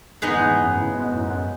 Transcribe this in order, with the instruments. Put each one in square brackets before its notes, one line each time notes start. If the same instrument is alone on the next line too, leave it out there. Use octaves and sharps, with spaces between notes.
[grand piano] E2 G#2 [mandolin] B3 D#4 G#4
[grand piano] E2 G#2
E2 G#2
F#2
A2 C#3
G#2 B2
F#2 A2
G#2
F#2